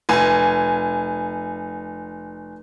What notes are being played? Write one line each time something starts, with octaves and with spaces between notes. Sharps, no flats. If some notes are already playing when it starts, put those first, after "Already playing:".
F1 G#5